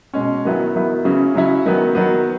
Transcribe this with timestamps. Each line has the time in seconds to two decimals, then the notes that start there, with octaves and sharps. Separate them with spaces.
0.14 B2 G#3 C#4
0.45 D#3 F#3 B3 E4
0.75 D#3 F#3 B3 E4
1.04 C#3 F#3 C#4 E4
1.35 C#3 F#3 C#4 E4
1.66 D#3 F#3 B3
1.95 D#3 F#3 B3